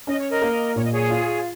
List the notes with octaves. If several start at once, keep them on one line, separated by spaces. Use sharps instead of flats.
C#4 D#5
C#5
A#4 D#5
A#3
A#2 C#5
D#5
G#4 C#5
F4